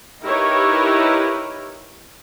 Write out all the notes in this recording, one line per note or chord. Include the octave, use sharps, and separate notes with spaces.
D#4 E4 G4 A#4 B4 C#5